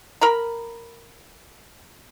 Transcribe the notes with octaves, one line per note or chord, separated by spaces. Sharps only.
A#4 A#5 B5